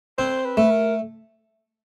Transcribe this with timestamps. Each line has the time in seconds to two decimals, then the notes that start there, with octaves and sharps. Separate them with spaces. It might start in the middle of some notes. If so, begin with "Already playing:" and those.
0.18 C4 C5
0.45 B4
0.57 A3
0.71 A#4